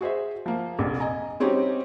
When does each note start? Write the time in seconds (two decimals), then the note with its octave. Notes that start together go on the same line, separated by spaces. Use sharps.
0.01 F#4 G#4 C5 E5
0.46 F3 A#3
0.79 F1 A#1
1.00 D#5 G#5 A#5
1.40 G3 C4 C#4 D#4 F#4 G4